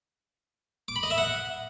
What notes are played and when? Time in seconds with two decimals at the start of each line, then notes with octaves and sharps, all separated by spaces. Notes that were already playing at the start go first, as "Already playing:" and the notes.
0.88 D6
0.96 B5
1.03 D#5
1.11 E5
1.18 F#5